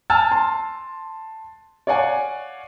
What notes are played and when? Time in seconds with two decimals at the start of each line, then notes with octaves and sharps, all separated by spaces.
0.10 G#5 A5 E6 F6 A6
0.32 A5 C6
1.87 C#5 D5 F5 F#5 G#5